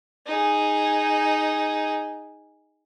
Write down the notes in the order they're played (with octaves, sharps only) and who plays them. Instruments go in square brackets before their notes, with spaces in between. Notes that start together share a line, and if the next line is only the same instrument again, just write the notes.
[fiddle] D#4 G#4